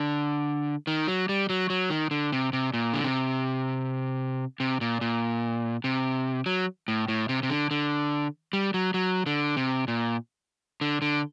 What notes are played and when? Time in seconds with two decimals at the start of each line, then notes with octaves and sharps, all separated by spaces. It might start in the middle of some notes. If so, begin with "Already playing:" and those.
Already playing: D3
0.87 D#3
1.08 F#3
1.29 G3
1.50 F#3
1.70 F#3
1.90 D#3
2.11 D3
2.33 C3
2.53 C3
2.73 A#2
2.94 D3
3.04 C3
4.60 C3
4.81 A#2
5.01 A#2
5.84 C3
6.46 F#3
6.88 A2
7.08 A2
7.29 C3
7.43 C3
7.50 D3
7.71 D3
8.53 G3
8.74 F#3
8.94 F#3
9.26 D3
9.57 C3
9.88 A#2
10.81 D3
11.02 D3